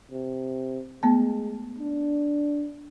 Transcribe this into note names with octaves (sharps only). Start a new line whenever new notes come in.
C3
G#3 A3 B3 A5
D4